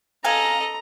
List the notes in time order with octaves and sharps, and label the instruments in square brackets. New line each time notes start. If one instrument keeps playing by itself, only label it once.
[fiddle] A4 D#5 [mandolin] F5 G#5 [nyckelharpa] A#5